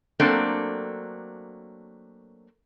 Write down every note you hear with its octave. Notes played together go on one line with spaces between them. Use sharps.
F#3 A3 A#3 C4 D4 A4